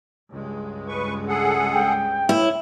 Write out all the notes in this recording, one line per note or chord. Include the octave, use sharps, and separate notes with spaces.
C#2 G2 G#3
B4 C#6
G#4 A4 F#5
G5
A2 E4